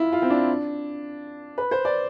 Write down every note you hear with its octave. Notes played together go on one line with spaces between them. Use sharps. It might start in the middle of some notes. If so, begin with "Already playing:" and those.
Already playing: E4 F4
F4
C4
D4
B4
C5
D5